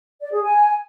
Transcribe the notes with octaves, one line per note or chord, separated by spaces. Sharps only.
D5
G#4
G#5